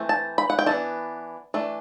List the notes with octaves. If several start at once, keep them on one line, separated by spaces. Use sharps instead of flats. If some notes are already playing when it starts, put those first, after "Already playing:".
Already playing: E3 A3 C4
A5
B5
F#5
G5
E3 B3 D4 A5
E3 A3 D4